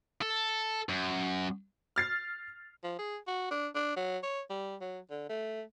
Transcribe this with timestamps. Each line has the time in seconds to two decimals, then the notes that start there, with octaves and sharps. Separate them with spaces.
0.22 A4
0.89 F#2
1.96 F6 A6 C7
2.83 F3
2.99 G#4
3.27 F#4
3.51 D4
3.75 D4
3.97 F#3
4.23 C#5
4.50 G3
4.81 F#3
5.10 D3
5.29 A3